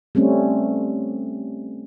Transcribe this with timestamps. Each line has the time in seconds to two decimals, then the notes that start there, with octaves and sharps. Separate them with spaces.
0.15 G3 A3 C4 C#4